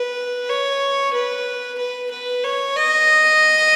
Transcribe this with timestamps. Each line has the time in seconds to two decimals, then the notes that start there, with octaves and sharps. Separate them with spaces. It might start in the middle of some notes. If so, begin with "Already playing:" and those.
Already playing: B4
0.49 C#5
1.14 B4
1.78 B4
2.11 B4
2.44 C#5
2.77 D#5